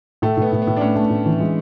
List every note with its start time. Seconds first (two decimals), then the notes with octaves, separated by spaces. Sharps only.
0.22 A2 A3
0.37 A2 B3
0.52 A2
0.62 B3
0.67 A2
0.77 D4
0.81 A3 C#4
0.96 A3
1.10 A2
1.26 E3
1.40 G#3